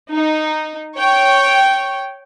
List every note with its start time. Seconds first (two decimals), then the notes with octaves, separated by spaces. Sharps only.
0.13 D#4
0.97 C#5 G5